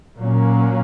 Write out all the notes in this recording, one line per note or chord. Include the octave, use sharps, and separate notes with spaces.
A#2 F#3 A#3 C#4